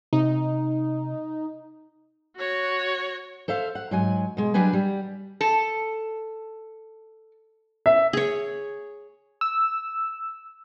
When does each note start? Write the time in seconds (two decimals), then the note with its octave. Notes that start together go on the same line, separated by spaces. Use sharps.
0.13 C3 D#4
2.36 F#4 C#5
3.48 A4 C5 E5 F5
3.75 F#5
3.91 G#2 F#3 G#5
4.37 B2 G#3
4.54 F#3 G3 D4 B4 G#5
4.73 G3
5.41 A4
7.86 E5
8.13 G#4 C#5
9.41 E6